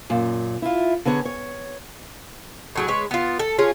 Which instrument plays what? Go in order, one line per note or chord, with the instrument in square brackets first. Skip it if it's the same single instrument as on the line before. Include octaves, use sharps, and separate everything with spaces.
[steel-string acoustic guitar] F#2 A#2
E4 F4
D3 B3 G#4 C#5
C#5
[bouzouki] A2 F#3 G#4
G#3 B4 C#5
B3 F4
A4
C#4 F4 G#4